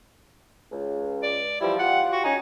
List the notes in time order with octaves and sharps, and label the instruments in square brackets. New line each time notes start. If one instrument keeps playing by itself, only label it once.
[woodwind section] C#2
[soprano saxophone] D5
[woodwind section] E3 F3 G3 [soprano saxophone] E4
[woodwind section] F4 G4 [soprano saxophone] F#5
[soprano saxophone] F#4
[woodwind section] C#4 G#5 [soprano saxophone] D#4